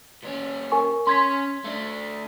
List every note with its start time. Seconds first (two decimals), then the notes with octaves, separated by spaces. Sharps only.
0.23 A#2 C#4
0.72 A#4 G#5 C#6
1.07 C#4 C6 G#6 B6
1.64 A3 D4